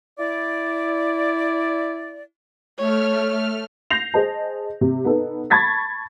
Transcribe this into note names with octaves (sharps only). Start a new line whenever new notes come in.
E4 D5
A3 C#5 F6
G6 A#6 C7 F7
G#4 C5 D#5 A5
C3
B3 D#4 A4
A5 B5 C#6 G#6 A6 B6